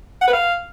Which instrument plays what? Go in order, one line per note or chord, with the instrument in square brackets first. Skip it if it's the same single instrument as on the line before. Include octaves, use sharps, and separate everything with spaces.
[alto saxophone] F#5
B4
F5